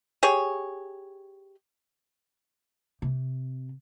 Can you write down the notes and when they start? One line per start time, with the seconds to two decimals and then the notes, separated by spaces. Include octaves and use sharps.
0.23 G4 G#4 C#5
3.02 C3